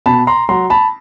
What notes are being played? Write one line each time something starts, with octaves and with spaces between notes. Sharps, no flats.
B2 A5 B5
A#5 C6
F#3 A#5 C6
A5 B5